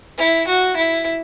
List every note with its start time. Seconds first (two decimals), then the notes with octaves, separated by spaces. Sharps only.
0.18 E4
0.47 F#4
0.76 E4